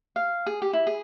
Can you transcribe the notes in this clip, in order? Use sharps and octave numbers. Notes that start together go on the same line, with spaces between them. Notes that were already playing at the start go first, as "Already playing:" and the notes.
F5
G#4
G4
E4
G#4